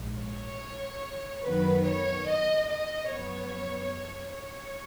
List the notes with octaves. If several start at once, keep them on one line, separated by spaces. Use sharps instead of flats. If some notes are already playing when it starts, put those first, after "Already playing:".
Already playing: A#1 G#2 F3
C#5
F#2 D#3 F#3 B3 B4
C#5
D#5
D#5
F#2 F3 B3 C#5
C#5